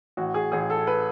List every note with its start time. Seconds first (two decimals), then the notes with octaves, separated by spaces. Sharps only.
0.17 A1 F#4
0.34 G#4
0.52 A1 G#4
0.70 A4
0.87 B4